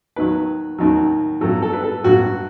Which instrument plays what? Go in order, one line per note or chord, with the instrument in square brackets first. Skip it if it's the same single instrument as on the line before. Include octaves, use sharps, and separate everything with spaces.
[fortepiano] D#2 D#3 F#3 B4
D#2 D#3 F#3
G2 F#3 A4
A4
B4
A4
G2 F#3 F#4